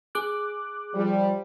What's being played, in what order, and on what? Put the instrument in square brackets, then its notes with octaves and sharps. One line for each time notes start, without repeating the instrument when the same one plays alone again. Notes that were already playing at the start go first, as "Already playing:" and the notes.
[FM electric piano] G#4 D6 F#6
[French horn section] F3 G3